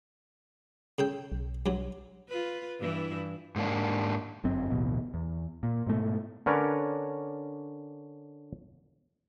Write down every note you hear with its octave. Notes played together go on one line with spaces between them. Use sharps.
C#3 A4 G5
B1
G2 F#3
F4 B4
G2 E3 E4
G#2 A#3 D4
G1 F#2 C4
D1 A1 B2
E2
A#2
G#2 B2 A3
D3 C#4 A#4 B4 C#5 D5